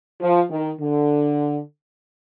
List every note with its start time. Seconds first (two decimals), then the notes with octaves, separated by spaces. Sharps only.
0.21 F3
0.50 D#3
0.79 D3